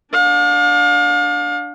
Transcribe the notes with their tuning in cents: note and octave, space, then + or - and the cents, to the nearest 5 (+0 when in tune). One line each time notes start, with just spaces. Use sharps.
D4 +0 F5 +40